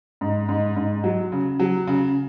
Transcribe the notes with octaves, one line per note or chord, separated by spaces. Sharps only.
G#2
G#2
G#2
F#3
C#3
F#3
C#3